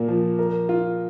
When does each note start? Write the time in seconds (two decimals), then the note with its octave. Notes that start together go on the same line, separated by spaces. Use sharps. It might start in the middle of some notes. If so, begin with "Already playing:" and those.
Already playing: A#2 A#3
0.08 F3
0.39 A#4
0.69 F4